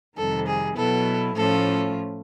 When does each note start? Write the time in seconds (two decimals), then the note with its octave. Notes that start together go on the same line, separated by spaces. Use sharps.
0.17 F2 C3 D#3 G3 A4
0.47 G#4
0.76 B2 F#3 B3 E4 A4
1.35 A2 F3 A3 C#4 F4 A4